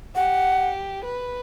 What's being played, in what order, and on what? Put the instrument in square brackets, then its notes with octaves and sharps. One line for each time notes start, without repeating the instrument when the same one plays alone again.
[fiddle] G4 [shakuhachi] F#5
[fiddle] B4